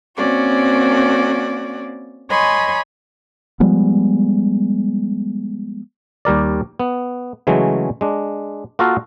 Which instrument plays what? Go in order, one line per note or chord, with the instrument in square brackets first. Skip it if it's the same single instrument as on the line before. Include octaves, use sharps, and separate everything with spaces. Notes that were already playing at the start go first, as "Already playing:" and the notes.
[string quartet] A#3 C4 C#4 F#4 D5
C#5 D#5 G#5 B5 C6
[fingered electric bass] F3 G3 G#3 B3
[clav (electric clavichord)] D#2 G3 A#4 D5
B3
C#3 E3 F#3 G#3 A3
G#3 D4
A#3 F4 F#4 A4 A#4 F5